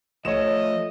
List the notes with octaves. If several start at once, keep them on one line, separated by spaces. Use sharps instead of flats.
F3 A3 C#5 D#5 E7